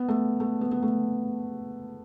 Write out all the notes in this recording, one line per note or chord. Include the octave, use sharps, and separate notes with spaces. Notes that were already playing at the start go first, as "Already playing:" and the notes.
Already playing: B3
A3
A3
B3
B3
A3